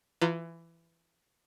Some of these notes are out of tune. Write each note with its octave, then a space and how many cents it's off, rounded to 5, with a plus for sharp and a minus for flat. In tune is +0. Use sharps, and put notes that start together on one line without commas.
E3 +20 F4 +0 A#5 -35